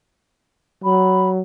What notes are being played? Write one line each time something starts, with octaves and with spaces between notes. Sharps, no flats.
F#3 B5